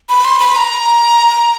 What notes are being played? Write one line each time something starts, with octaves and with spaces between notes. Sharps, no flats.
B5
C6
B5
A#5